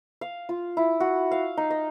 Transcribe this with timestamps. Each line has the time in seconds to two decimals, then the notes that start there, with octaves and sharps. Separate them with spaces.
0.21 F5
0.49 F4
0.77 E4
1.00 F#4
1.31 F5
1.57 D#4
1.70 D#5